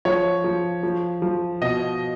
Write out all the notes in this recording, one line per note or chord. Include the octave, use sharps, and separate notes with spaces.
F3 C#5
F3
F3
F3
B2 D#5